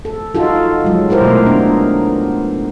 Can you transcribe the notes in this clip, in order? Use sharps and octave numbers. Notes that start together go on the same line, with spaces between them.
A4
D#4 F4 F#4 A4
F#3 G#3
E4 G4 A#4 C5
B2 A3
B3 D4